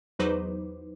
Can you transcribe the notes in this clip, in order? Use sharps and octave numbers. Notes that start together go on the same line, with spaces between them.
E2 F#3 D#4 B4 C5 D6